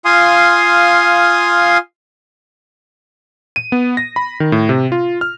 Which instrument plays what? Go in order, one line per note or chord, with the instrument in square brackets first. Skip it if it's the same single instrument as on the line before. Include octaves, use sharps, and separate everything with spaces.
[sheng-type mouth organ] F4 F5 G#5 C6 D#6
[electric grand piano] D#7
B3
A#6
B5
D#3
A2
C3
F4
F6